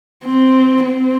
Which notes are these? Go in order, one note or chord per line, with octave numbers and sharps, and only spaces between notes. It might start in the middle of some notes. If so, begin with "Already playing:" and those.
C4
C4